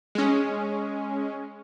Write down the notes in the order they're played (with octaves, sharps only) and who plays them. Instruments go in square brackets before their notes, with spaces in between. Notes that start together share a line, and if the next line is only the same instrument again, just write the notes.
[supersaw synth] G#3 C#4